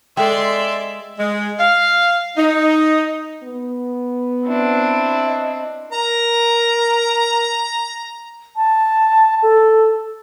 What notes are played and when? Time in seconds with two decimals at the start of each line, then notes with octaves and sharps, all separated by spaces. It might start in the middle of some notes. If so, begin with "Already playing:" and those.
0.17 G#3 A4 D5 E5 G5 C6
1.18 G#3
1.59 F5
2.37 D#4
3.43 B3
4.47 C4 D4 E4
5.27 D#5
5.92 A#4 A#5
8.56 A5
9.43 A4